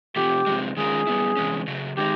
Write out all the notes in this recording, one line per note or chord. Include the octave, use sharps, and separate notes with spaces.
C3 F3 A3 G4
C3 F3 G#3
D#3 G#3 C#4 F4 G#4 A#4
G3 B3 E4
C3 E3 G#3 C#4
C#3 F#3 A3
D#3 G#3 C4 D#4 G4